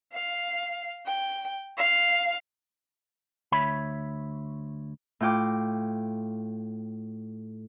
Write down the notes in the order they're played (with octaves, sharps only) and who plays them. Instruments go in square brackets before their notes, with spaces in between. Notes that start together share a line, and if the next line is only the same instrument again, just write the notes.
[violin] F5
G5
F5
[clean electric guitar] D2 C#5 E5 B5
[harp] A2 F4 G5 D6